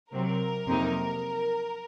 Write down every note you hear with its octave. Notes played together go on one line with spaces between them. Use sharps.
C3 F#3 C4 A#4
F2 C3 F#3 A#3 D#4